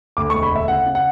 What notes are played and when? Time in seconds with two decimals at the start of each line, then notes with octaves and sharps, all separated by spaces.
0.17 D2 D6
0.30 C#6
0.34 E1
0.43 B5
0.52 D2 E5
0.68 C#3 F#5
0.86 C#3
0.95 F#5